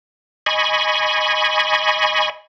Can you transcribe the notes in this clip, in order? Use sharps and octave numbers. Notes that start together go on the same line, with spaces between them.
D#5 G#5 B5 C#6